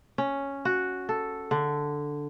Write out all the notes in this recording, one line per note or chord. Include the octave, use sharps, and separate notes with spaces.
C#4
F#4
A4
D3